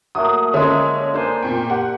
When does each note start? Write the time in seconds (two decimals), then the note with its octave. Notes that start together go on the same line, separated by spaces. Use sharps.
0.15 F#3 A3 A#3 D#6
0.53 D3 F3 G#3 C#4 E5
1.14 A#3 D4 C5 G#5
1.42 A#2 G5 C#6
1.70 G4 D5 F#5